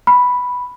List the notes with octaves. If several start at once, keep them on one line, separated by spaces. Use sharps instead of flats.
B5